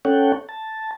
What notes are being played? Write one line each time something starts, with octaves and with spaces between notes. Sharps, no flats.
C#4 A4 C#5 F#5 G5
A5